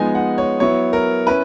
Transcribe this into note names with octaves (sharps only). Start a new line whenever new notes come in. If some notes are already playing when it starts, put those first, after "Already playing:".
Already playing: F3 G#3 B3 D#4 G#5
F#5
C#5
F#3 B3 E4 C#5
A#4
C#4 E4 B4